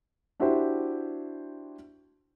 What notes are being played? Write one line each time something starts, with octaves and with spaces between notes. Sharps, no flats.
D4 E4 F#4 G4 C5